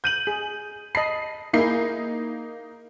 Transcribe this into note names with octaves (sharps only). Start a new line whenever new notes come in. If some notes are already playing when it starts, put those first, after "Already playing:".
G6 D#7 F#7
G#4
D#5 A5 B5 C7
A#3 D#4 E4 G#4 C7